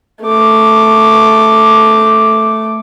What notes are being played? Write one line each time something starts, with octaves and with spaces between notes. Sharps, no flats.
A3 D6